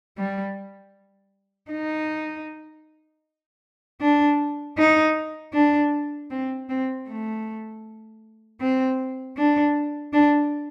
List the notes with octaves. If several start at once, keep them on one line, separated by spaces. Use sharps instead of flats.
G3
D#4
D4
D#4
D4
C4
C4
A3
C4
D4
D4